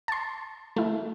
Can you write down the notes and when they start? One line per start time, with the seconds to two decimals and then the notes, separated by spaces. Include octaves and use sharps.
0.08 A5 C6
0.76 A3 E4